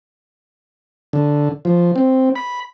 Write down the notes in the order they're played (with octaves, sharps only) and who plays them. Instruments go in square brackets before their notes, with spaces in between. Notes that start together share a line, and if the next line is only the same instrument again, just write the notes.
[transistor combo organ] D3
F3
C4
B5